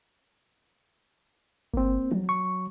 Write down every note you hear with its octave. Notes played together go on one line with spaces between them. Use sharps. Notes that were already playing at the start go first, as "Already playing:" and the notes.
G1 A#3 C4
F3 F#3
C#6